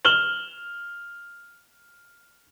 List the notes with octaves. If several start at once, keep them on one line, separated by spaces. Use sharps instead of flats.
F6 E7 F#7 G7